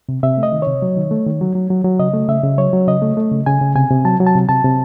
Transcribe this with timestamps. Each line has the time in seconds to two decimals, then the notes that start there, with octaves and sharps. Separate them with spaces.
0.09 C3
0.23 C3 E5
0.38 A3
0.43 D#5
0.52 D#3
0.62 C3 C#5
0.82 F#3
0.97 D#3
1.11 A3
1.27 D#3
1.41 F#3
1.55 F#3
1.70 F#3
1.84 F#3
1.99 C#3 D#5
2.14 A3
2.29 C#3 E5
2.43 C#3
2.58 F#3 C#5
2.73 F#3
2.88 C#3 D#5
3.02 A3
3.17 A3
3.32 C#3
3.46 C#3 G#5
3.61 C#3
3.75 C3 G#5
3.90 C3
4.05 F#3 A5
4.20 F#3
4.27 A5
4.35 C3
4.49 C3 A5
4.64 C3